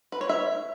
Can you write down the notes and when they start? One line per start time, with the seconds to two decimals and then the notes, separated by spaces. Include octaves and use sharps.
0.12 B4
0.21 C#5
0.29 E5